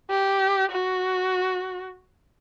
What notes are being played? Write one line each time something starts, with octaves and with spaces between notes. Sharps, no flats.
G4
F#4